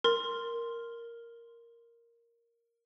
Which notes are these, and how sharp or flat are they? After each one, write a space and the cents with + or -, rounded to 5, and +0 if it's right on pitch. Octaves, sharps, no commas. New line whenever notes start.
A#4 +0 C6 +0